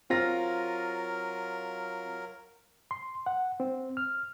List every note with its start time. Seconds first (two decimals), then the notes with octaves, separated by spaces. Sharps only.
0.10 F#3 C4 F4 A#4 A#6
2.91 C6
3.26 F#5
3.60 C4
3.97 F6